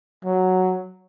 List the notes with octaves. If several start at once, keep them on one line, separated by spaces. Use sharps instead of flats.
F#3